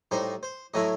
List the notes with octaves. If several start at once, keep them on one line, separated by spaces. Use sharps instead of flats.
A2 G3 D#4 C5
C5
A2 F#3 A3 E4 D#5